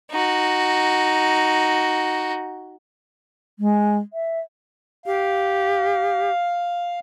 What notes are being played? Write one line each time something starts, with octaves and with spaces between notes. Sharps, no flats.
D#4 F#4
G#3
E5
G4 F5